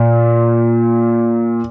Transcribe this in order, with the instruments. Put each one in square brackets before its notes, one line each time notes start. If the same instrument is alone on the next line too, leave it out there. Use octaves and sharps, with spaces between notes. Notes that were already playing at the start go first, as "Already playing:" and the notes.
Already playing: [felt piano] A#2